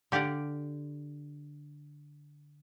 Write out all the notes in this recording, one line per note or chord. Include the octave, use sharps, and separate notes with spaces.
D3 G4 D5 F5 F#5